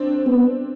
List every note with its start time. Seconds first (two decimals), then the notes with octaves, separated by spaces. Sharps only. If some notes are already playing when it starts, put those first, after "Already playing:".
Already playing: C4 D4
0.26 B3